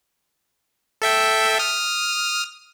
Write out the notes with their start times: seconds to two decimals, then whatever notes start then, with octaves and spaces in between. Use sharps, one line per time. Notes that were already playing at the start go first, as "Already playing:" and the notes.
1.02 A4 E5 G5
1.59 D#6 F6